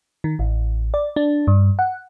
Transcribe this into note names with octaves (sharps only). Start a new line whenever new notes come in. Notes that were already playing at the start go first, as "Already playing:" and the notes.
D#3
A1
D5
D4
G2
F#5